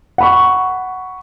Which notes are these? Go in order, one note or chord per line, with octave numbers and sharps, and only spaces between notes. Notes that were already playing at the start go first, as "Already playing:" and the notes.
F#5 B5 C#6